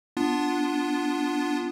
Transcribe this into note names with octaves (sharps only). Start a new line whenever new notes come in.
B3 D4 F4